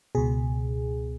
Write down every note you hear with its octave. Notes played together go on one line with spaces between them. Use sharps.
C#2 B2 G#4